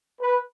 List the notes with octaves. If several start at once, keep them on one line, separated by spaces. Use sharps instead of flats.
B4